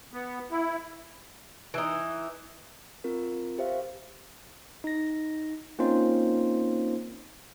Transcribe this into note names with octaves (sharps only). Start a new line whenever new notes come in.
B3
E4
E3 D#4
C4 F4 A#4
G4 C5 E5 F5
D#4 A#6
A#3 C4 C#4 D#4 F4 C5